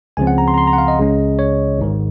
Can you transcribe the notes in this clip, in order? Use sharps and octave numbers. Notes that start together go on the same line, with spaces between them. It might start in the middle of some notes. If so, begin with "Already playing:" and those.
C#2 C#3 F3 C4 G#5
F#5
A#5
C6
A#5
C6
A#5
F#5
F5
D#5
C#2 C#3 G#3 C#4
C#5
G#1 G#2 D#3